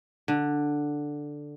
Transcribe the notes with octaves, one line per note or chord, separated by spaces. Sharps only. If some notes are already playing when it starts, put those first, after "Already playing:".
D3